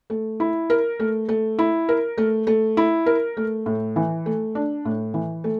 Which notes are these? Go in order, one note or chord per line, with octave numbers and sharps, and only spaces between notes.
A3
E4
A#4
A3
A3
E4
A#4
A3
A3
E4
A#4
A3
A2
E3
A3
D4
A2
E3
A3